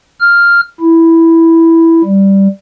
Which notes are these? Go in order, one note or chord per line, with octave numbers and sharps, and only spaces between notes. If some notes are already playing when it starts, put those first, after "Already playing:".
F6
E4
G3